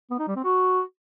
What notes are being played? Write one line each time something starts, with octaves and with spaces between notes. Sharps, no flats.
B3
D#4
G3
C4
F#4